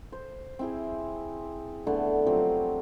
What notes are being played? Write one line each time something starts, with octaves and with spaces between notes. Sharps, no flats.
C5
C4 E4 G#4
D3 A3 B3 C6
F3 F#3 C4 G4